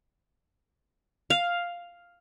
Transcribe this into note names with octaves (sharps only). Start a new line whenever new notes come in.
F5